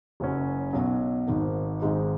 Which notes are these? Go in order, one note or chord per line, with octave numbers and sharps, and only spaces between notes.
F#1 F#2 F#3 C#4
B1 B2 F#3
G#1 G#2 D#3
G#1 G#2 G#3 D#4